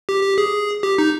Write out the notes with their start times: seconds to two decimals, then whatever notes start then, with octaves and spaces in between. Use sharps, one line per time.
0.09 G4
0.23 G4
0.38 G#4
0.83 G4
0.98 D#4